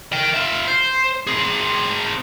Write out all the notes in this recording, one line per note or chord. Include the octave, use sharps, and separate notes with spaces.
A#4 G5
F4 E5
C5
C4 G#4